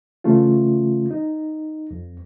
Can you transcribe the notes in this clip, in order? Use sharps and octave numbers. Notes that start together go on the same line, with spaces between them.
C#3 E3 A3 C#4 F4
D#4
F2